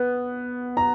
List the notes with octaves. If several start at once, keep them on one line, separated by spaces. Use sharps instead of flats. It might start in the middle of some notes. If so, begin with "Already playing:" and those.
Already playing: B3
A#5